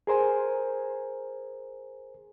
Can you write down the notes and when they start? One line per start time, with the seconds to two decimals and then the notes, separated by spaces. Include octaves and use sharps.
0.07 G#4 A#4 C5 G#5